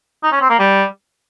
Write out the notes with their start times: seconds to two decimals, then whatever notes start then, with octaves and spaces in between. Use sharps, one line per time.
0.23 D#4
0.32 C#4
0.41 C4
0.50 A#3
0.59 G3